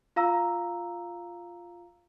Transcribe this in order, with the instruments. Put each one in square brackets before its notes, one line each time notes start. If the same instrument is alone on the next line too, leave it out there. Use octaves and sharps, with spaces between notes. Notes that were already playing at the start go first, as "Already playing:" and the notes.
[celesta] F4 F5 A#5 E6